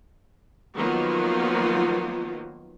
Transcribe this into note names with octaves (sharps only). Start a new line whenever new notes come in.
D#3 F3 F#3 A#3 B3 F4